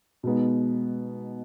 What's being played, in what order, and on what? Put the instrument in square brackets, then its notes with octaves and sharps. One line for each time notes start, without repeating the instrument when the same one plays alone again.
[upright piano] B2 G#3 B3 D#4